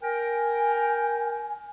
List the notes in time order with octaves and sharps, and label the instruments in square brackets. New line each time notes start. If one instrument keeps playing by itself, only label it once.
[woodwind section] A#4 G5 [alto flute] G#5